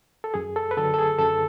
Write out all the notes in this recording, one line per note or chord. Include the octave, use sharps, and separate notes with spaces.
A4
F#2 G#4
A4
B4
D3 F#3 A4
A4
G#4
F#2 A4